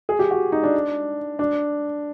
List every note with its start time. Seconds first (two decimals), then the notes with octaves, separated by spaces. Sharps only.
0.09 G#4
0.19 G4
0.31 F#4
0.52 D#4
0.63 D4
1.39 D4